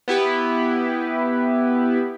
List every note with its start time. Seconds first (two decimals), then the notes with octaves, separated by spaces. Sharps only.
0.08 B3 E4 G4 B4